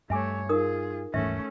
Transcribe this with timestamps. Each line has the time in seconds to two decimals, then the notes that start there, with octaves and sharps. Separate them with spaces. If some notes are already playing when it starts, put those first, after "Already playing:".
0.10 G2 A3 C#5 E5 G#5 D6
0.49 D#4 F4 G#4 A#4 D#6
1.14 D#1 G#2 E3 A3 C#4 E5